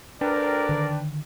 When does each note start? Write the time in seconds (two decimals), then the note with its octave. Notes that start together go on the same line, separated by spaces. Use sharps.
0.21 D2 D4 A#4 B4 D5 G5
0.69 D3 D#3